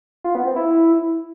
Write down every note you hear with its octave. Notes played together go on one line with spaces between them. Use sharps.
F4
B3
C4
E4